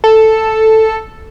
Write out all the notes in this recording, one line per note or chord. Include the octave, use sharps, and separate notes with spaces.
A4